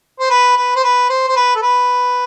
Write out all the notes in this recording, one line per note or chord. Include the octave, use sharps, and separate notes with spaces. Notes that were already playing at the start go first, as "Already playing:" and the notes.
C5
B4
B4
C5
B4
C5
C5
B4
A4
B4